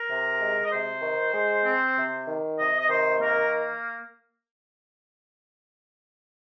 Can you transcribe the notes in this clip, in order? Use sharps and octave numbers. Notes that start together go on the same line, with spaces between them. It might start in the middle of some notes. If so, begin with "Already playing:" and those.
Already playing: A#4
C3
G#3
D#5
C3 C5
D#3
G#3
C4
C3
D#3
C3 D#5
D#5
D#3 C5
A#3 A#4